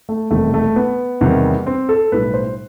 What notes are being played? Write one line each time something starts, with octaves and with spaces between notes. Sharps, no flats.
A3
E1 E2 C3 D#3 G3 A3
A3
B3
E2 C3 D#3 G3
C4
A4
B1 A2 G3 B4
C5